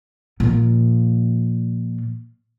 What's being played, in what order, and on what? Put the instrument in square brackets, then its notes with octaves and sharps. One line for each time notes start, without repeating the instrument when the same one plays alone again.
[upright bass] A#2 F3